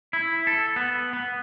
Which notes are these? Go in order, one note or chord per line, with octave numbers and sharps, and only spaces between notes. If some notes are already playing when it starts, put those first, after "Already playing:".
E4
A4
B3
B3